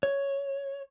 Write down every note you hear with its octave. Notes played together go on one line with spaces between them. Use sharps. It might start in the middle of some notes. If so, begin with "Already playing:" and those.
C#5